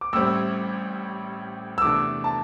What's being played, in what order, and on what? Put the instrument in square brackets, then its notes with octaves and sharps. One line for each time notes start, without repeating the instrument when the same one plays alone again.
[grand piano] D6
[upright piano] A1 A2 G3 C4 [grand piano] E6
[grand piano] E6
[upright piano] E2 C3 E3 A3 D4 [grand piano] D6
[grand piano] A5